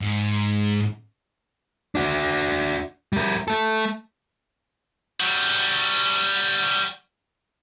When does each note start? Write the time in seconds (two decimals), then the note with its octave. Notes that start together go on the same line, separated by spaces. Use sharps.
0.01 G#2
1.95 D4 F#4
3.13 G3 A#4
3.48 A3 A4
5.20 G3 F#4